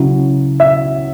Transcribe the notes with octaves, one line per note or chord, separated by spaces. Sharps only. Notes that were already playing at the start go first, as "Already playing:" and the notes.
Already playing: C#3 F#3 C#4 E4
E5